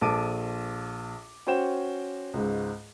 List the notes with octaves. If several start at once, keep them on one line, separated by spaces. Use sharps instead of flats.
A#1 A4 A5 D6 D7 D#7
C#4 F#4 C5 G5 E7
C#2 G#2